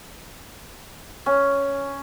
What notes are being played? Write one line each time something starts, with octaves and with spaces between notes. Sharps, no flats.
C#4